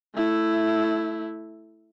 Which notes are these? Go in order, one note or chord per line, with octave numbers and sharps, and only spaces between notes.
A3 E4